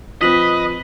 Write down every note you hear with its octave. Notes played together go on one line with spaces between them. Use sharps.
F3 C4 B4 D#5 B6 F#7